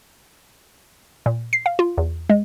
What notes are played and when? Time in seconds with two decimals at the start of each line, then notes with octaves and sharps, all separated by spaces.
1.26 A#2
1.53 C7
1.66 F5
1.79 F4
1.98 E2
2.30 G#3